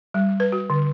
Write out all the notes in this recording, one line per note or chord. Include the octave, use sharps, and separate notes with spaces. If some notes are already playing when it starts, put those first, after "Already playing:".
G3
B4
F#4
D3